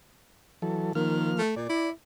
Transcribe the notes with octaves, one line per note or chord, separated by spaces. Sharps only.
E3 F#3 A4
D#3 F3 A#3 F6
A3
A#2 D5
E4